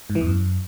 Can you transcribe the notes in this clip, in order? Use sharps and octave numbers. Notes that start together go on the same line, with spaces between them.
G#2
E3
E2
F#2